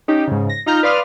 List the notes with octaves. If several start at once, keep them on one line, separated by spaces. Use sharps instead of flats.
C#4 D#4 G4
G#2 C#3
A#6
D#4 F4 A#5 F6 G6
B4 D5 F5 C6 D#6 F6